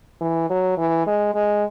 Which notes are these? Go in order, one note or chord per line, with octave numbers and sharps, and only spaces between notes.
E3
F#3
E3
G#3
G#3